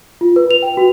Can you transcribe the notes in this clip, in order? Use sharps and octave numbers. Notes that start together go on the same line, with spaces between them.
F4
B4
F7
G5
F#4